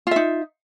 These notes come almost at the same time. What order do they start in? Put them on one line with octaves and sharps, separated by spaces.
F4 E5 D#4